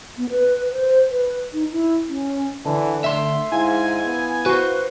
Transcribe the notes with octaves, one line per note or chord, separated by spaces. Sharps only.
B3
B4
C5
B4
D#4
E4
C#4
D3 E3 A5
A3 E5 C6
G#2 E4 F5 G#5
B3
F#4 B4 C5